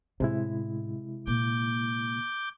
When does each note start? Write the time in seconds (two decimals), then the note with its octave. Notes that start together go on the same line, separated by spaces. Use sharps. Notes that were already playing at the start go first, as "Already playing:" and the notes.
0.20 A2 C3 G#3 C#4 E4
1.27 A#2 A#3 D6 G6